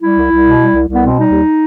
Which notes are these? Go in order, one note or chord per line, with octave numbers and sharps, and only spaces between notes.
G3 E4
C2
C2
B2
G3
C2
C2 B3
B2 C4
G3 D#4
D#2